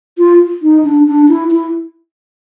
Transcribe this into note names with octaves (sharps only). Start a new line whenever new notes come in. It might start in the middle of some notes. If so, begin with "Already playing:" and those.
F4
D#4
D4
D4
E4
E4